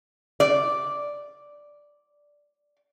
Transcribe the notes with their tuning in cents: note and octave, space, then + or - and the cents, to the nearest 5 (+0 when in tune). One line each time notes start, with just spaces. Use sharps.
D5 -5